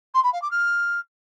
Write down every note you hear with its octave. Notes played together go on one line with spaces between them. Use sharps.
C6
B5
F5
D6
F6